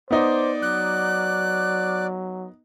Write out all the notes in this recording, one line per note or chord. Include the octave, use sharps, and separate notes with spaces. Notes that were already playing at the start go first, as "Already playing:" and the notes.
B3 D#4 C5 D5 D6
F#3 F#6